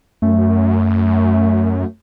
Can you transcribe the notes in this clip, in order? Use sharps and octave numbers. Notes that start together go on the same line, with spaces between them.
F#2 A3